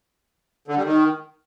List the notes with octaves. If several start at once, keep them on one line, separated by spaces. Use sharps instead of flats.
D3
G3
D#3